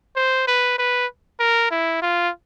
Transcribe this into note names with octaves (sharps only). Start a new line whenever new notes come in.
C5
B4
B4
A#4
E4
F4